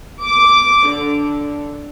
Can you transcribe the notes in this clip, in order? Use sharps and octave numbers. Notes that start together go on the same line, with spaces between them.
D6
D3